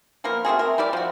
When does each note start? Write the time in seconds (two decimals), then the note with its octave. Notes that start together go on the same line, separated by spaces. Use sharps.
0.24 F3 A#3 B3 A#4
0.45 A3 C4 F#4 G#4
0.59 A#4
0.78 G3 E4 G4 D5
0.93 F3 F#4